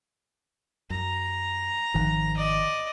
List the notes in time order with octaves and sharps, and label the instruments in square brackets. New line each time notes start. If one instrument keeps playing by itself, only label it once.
[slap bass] F#2 [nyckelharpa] A#5
[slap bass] G#1 D#3 F3
[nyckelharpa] D5 D#5